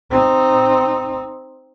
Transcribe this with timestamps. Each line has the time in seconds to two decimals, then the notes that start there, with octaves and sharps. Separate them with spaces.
0.10 C4 D#4